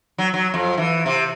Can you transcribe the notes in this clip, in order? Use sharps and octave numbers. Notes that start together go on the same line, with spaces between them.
F#3
F#3
F2
E3
C3